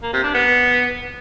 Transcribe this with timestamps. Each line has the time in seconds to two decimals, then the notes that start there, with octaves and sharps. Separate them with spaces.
0.03 A#3
0.13 C3
0.24 D4
0.34 B3